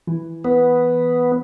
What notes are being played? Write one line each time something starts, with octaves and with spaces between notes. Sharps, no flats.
E3
B3